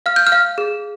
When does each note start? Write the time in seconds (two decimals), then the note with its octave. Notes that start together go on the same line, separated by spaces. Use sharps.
0.06 F5 F6
0.16 G6
0.27 F6
0.32 F5
0.58 G#4